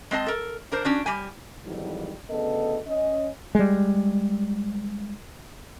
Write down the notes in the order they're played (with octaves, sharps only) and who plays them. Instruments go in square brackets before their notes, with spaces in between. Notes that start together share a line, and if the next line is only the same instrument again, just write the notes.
[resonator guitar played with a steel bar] G#3 C4 D#5 A5
A4 A#4
D4 A#4 C5
C#4 D4 F#4
G3 G4 G#5
[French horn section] F2 G#2 D#3 E3 F#3 G3
D2 C#3 B3 A4 D#5
C#4 D#5
[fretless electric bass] G3 G#3